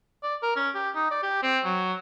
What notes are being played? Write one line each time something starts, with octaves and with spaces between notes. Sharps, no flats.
D5
A#4
C#4
G4
D#4
D5
G4
C4
F#3